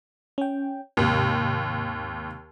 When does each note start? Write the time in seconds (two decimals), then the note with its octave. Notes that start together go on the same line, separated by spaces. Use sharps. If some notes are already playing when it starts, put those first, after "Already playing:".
0.38 C#4 G5
0.97 D#2 G#2 C3